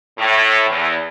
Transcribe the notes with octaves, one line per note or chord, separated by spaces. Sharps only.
A2
E2